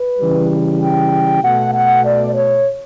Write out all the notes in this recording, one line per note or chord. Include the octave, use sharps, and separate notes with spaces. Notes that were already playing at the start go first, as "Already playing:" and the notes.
Already playing: B4
C#3 E3 G3
G5
B2 A3 F#5
F#5
D5
C#5